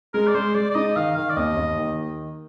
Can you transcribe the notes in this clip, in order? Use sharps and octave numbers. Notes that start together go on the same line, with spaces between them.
G#3 A#4
D5
G#3 C5
G#3 D5
D5
D#4 D#5
D#3 F5
D#3 F5
D5
D#2 D#5
D#2
D#3